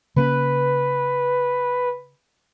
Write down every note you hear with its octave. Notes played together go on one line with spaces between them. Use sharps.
C#3 A#3 C#4 B4